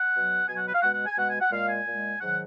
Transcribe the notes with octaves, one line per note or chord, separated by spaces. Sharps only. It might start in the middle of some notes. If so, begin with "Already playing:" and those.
Already playing: F#5
B2 F#3
B2 F#3 G#5
F#5
B4
F5
B2 G#3 F#5
F#5
G#5
B2 G#3 F#5
G#5
F#5
A#2 G#3 F5
G#5
A#2 G#3
G#2 D#3 F#3 F#5